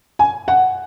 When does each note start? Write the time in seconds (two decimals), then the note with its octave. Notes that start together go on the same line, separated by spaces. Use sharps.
0.19 G#5
0.48 F#5